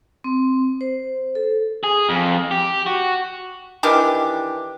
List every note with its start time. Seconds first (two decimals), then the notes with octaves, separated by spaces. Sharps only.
0.24 C4
0.81 C5
1.35 A4
1.84 G#4
2.09 F2
2.51 G4
2.86 F#4
3.83 D#3 E3 D4 G4